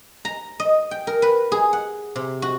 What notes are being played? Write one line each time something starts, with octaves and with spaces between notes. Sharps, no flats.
A#5
D#5
G5
A#4
B4
G#4
F#5
C3
F#4